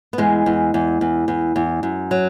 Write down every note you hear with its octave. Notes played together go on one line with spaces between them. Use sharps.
B3
E2 G#3
E2
E2
E2
E2
E2
F#2
F#3